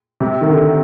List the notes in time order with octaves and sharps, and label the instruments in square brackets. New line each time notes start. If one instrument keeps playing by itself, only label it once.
[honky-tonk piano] C3
D#3
D3